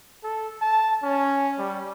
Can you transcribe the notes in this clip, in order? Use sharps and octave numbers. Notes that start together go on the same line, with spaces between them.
A4
A5
C#4
G3